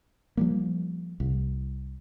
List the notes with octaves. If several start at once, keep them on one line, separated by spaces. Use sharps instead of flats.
F3 G3 A#3
C2